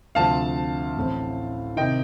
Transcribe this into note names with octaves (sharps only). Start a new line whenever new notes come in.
D2 C3 F3 F5 A5
A1 A2 A3 C4
C3 D#3 D#5 G5